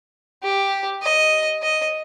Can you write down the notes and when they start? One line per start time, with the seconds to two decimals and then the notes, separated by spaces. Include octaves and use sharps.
0.43 G4
1.03 D#5
1.63 D#5